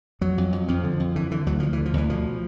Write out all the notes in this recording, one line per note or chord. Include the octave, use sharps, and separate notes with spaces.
F2 F#3
F2
F2
F2 F3
D3
F2
D3 E3
D3 E3
D2 F#3
D2 F3
E3
D3
F3
D2 E3
B2 F3